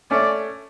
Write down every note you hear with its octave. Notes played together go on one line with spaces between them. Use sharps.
A3 C#4 D5